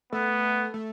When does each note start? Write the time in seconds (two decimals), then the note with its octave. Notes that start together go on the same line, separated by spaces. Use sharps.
0.13 A3 B3
0.74 A3